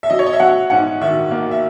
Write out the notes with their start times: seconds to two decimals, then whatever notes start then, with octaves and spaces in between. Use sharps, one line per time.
0.03 E5
0.10 F#3 D#5
0.19 C#5
0.26 D#5
0.33 E5
0.40 F#3 F#5
0.70 G#2 F#5
1.01 D#3 E5
1.31 A#3
1.51 E5